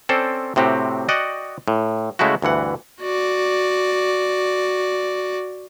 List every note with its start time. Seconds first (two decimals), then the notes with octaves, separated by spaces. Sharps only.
0.09 C4 C#4 A4 C5 D5
0.56 A2 C3 C4 F#4 G4
1.09 F#4 D5 D#5 F#5 G5
1.68 A2
2.19 C#3 G#3 A3 E4 F#4
2.42 D2 G2 E3 F#5
3.02 F#4 D5